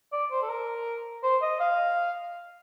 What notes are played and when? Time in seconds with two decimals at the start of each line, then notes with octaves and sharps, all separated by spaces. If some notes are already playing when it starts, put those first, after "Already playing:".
0.13 D5
0.31 C5
0.43 A4
0.49 A#4
1.23 C5
1.42 D#5
1.60 F5